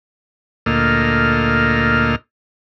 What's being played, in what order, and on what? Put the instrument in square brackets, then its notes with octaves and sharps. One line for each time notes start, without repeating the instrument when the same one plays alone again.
[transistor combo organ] D2 A#2 A#3 A4 D#5 F6